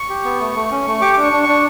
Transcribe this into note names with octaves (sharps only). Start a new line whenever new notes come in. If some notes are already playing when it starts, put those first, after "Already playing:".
Already playing: C#6
G4
B3
A3
A3
C#4
A3
G4 D6
D6
D4
C#6
D4
C#6
D4